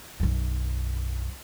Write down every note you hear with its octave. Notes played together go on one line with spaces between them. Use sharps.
B1 F#2